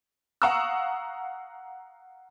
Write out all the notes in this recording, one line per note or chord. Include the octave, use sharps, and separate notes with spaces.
F5 F#5 A#5 C#6 D#6 E6